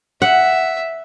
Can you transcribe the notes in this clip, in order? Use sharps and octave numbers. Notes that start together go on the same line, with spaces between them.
E5 F#5